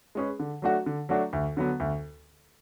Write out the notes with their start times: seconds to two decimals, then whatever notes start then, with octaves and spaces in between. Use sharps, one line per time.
0.15 G#3 C#4 G#4 B4
0.40 D3
0.62 F#3 A3 D4 F#4
0.86 D3
1.09 F#3 A3 D4 F#4
1.33 D2
1.57 D3 F#3 B3
1.80 D2